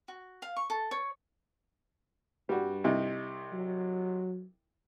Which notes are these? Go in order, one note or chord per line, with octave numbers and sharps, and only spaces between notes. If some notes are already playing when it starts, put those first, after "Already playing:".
F#4
F5
C#6
A4
C#5
G2 G3 F#4
C2 C3 D#4
F#3